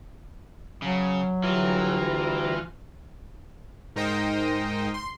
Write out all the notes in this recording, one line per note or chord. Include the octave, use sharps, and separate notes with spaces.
C#3 F#3
D2 E3 G3 F4 A#5
G#2 D#4 A#4 C5 D#5 G5
C6